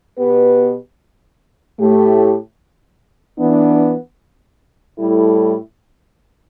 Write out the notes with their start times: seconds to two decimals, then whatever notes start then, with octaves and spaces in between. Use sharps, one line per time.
0.17 B2 B3 G4 B4
1.79 A2 A3 G4
3.38 E3 B3 D4
4.99 A2 G3 E4 A4